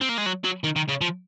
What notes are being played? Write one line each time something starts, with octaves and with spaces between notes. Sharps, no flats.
C4
A#3
G#3
F#3
F#3
D#3
D#3
C#3
F3